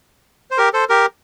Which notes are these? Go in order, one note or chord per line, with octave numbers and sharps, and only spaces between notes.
C5
G4 A#4
A4 C5
G4 A#4